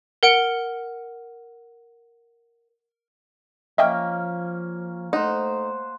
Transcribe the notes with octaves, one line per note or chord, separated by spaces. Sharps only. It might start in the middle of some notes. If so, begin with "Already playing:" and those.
A#4 F#5 C#7 D7
F3 A#3 C#4 D#5 E5 G5
A3 D#4 C5 F#5